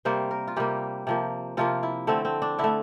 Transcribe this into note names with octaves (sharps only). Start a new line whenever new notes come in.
C3 G3 A#3 C5
A#4
F4
C3 G3 A#3 G4
C3 F3 A#3
C3 F3 A#3 F4
E4
D3 A3 C4
C4
D4
D3 E4
A3